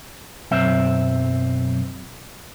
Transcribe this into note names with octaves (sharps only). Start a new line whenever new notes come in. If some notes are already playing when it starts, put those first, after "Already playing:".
B1 F#2 C4 E5